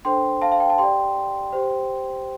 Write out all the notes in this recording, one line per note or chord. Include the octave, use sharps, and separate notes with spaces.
D4 A4 C5 G5 C6
F5 A5
F5
G5
A5
G4 D5 G5 C6
G4 C5